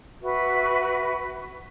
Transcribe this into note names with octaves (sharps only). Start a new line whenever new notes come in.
F#4 B4 E5